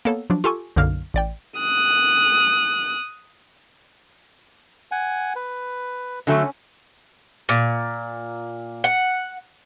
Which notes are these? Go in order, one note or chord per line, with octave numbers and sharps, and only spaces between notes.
A#3 B3 A4 C#5
F3 F#3 D4
F4 G4 A4 G#5 C#6
B1 F#2 D3 A#3 F5 F6
A1 D5 G5
D#6 F#6
F#5 G#5
B4
D3 F#3 A3 C#4
A#2
F#5